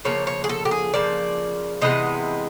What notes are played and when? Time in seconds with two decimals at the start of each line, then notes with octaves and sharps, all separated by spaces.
0.05 C#3 F3 A#3 C#5
0.27 C#5
0.44 G#4
0.49 A4
0.65 G4
0.71 G#4
0.93 C#3 F3 A#3 D5
1.81 C3 E3 G#3 B3 D#5